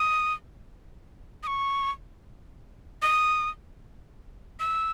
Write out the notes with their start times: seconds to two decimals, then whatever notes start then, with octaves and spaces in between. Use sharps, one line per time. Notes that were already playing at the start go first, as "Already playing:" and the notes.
Already playing: D#6
1.43 D#6
1.47 C#6
3.02 D#6
4.60 E6